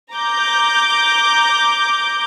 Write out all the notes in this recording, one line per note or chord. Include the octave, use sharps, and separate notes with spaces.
A#5 D6 G6